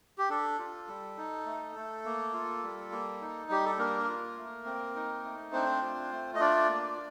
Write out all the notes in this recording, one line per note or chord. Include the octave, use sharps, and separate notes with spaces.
G4
D4 A4
F4
G3
D#4
A3
A3
A#3
F4
G3
A#3
D#4
G3 G4
A4
A#3 D4 A#4
F4
A3
C4
D#4
A3
C4 D4 C5
F4
A3
D#5
D4 F4 D5
A#3